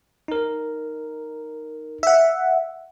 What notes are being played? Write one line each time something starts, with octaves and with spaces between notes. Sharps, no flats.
D#4 A#4
E5 F#5